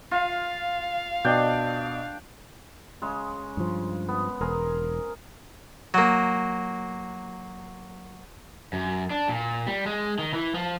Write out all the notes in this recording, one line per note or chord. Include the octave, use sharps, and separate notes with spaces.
F4 F5
B2 D4 D5 D#5 G5
C#3 G#3
G2 F3
B3
E1 G#4 A#4 C5
F#3 A#3
F#2
D4
A#2
G3
G#3
D#3
E3
F3